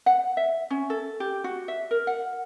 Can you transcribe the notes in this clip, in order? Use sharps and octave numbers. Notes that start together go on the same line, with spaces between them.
F#5
E5
C#4
A4
G4
F#4
E5
A#4
F#5